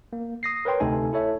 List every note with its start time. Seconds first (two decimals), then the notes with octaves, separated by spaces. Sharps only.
0.13 A#3
0.43 D#6 A#6 C7
0.65 A#4 B4 C#5 G5 C6
0.80 D2 C3 A3 D#4 A4 G#5
1.13 E4 A4 C#5 E5